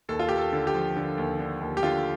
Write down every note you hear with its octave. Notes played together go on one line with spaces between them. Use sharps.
D#2 A4
F4
D#2 G4
A4
D3
G4
F3
D3
D#2
D3
D#2
G4
D3 F4